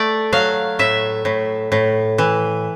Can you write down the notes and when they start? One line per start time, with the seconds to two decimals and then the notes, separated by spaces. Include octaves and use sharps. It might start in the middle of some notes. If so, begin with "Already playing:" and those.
Already playing: A3 D5
0.32 F#3 F5
0.79 A2 E5
1.25 A2
1.72 A2
2.18 E3